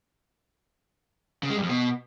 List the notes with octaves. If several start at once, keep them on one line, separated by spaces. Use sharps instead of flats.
C#3
G#3
G2
F2
B2